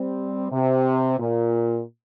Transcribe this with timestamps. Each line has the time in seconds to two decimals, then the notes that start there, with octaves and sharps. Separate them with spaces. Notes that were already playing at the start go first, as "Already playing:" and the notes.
Already playing: G3 C4
0.52 C3
1.19 A#2